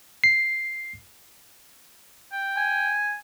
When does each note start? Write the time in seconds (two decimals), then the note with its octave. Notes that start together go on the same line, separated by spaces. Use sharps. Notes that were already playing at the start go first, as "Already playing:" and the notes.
0.24 C7
2.32 G5
2.57 G#5